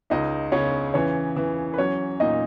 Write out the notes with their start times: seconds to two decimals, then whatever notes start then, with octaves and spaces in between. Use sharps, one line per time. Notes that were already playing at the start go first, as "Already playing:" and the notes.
0.10 C#2 D#4 D#5
0.52 C#3 C#4 C#5
0.94 E3 C#4 C#5
1.37 E3
1.74 B4
1.78 F#3 C#4 C#5
2.20 A#2 D#4 D#5